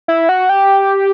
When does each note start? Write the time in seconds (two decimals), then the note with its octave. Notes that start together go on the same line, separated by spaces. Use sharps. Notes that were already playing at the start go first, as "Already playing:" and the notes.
0.08 E4
0.29 F#4
0.49 G4